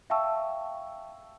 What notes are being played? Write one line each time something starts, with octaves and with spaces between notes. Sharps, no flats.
E5 F5 G5 A5 C#6 E6